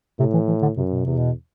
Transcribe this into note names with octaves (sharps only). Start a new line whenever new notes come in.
A2 C3
E3
E3
D3
F#2 C3
B2
E2 C3
B2